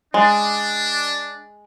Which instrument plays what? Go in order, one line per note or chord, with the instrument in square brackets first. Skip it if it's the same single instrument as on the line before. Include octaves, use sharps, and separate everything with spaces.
[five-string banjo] G#3 [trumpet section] D4